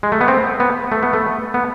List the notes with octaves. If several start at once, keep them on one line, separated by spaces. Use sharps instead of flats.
G#3
A3
B3
C4
B3
A3
B3
A3
B3